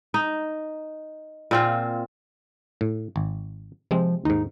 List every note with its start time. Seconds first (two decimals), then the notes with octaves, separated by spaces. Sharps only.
0.14 D#4
1.51 A#2 C4 F4
2.81 A2
3.16 G#1
3.91 C3 F3 G#3 C4
4.25 D#2 G#2 D#4